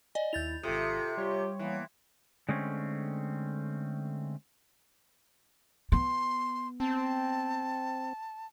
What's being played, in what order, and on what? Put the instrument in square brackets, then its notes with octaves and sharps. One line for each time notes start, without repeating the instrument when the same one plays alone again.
[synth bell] D5 D#5 G#5
[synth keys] D#2 E4 [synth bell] G6 A6 F7
[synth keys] G#1 D#6 [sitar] C3 [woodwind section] F4 A4
[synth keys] G3 C#5 [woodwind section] F4 G4
[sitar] E3 [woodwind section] A#3 B3
[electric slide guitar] D3 G#3 A3 C4 C#4
[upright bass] B3 [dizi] C6
[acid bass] C4 [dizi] A5